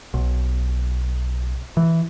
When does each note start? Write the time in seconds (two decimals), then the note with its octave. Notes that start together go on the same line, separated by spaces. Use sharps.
0.14 B1
1.77 E3